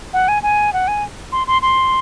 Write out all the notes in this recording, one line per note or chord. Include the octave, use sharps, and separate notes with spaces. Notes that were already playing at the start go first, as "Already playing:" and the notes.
F#5
G#5
G#5
F#5
G#5
C6
C6
C6